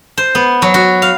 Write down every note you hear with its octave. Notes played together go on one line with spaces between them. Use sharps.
C5
B3
F#3
F#4
F5